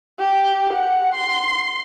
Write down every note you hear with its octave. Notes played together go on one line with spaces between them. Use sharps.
G4
F#5
C6